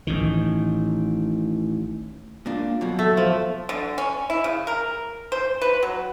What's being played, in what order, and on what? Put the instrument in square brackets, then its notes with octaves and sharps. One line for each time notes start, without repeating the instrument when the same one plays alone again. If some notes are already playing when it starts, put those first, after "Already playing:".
[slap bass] A1 A2 D#3
[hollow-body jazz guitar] A#2 D4
B2 F#3
[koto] A3
F3
[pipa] D3
C#4
E4
C#3
A#4
C5
B4
F#3